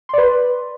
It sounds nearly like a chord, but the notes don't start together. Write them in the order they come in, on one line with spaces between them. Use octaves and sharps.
C6 D5 B4